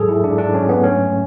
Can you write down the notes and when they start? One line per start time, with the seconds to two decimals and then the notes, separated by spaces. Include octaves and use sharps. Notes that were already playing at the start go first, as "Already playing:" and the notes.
Already playing: G#2 F#3 G#4 A4
0.09 E4
0.24 G#2 D4
0.38 D4
0.54 F#3 C#4
0.69 B3
0.83 A3 C#4